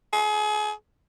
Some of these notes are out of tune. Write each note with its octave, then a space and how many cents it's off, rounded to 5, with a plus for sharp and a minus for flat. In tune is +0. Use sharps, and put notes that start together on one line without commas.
G#4 +35